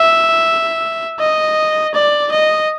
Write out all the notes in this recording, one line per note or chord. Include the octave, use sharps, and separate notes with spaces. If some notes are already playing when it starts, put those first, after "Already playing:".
Already playing: E5
D#5
D5
D#5